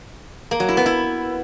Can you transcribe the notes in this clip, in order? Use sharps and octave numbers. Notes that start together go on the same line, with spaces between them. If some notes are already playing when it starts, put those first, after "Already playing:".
A#3
F#3
E4
B3
E4